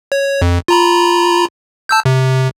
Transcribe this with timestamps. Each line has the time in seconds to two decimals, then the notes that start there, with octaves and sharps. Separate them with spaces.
0.12 C#5
0.42 F2
0.68 F4 A#5 B5
1.89 A5 E6 G6
2.05 C3